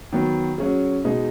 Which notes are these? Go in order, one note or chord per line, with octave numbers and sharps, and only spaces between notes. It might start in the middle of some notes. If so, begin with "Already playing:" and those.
D#3 F#3 B3
F#3 C#4 G#4
B2 G#3 D#4 G#4